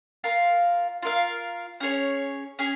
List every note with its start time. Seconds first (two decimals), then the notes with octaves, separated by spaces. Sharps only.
0.24 F4 A#4 F5
1.03 F4 A#4 F5
1.80 C#4 G#4 C#5
2.59 C#4 G#4